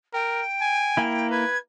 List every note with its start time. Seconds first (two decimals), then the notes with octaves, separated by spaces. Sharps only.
0.13 A#4 G5
0.61 G#5
0.97 A#3 E4
1.30 B4 G#6